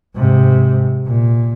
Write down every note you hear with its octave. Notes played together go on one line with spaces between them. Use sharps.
G#2 C3
A#2